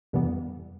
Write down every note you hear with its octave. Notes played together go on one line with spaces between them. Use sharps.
F2 C3 E3 G3 B3